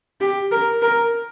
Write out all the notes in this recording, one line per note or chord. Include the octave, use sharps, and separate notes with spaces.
G4
A#4
A#4